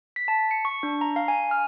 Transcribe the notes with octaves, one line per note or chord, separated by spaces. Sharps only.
B6
A5
C#7
C#6
D4
A#5
F5
G#5
F6